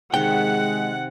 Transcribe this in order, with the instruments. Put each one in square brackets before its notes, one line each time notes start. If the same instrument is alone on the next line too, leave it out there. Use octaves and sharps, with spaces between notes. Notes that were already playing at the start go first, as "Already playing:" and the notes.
[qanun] C3 D#3 [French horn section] G#3 [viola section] F#5 [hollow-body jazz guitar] G5